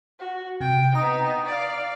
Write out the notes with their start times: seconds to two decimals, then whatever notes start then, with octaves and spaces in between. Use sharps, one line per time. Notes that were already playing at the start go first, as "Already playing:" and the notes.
0.19 F#4
0.61 C3 G5
0.95 B3 D#4 A#5 D#6
1.46 D5 F5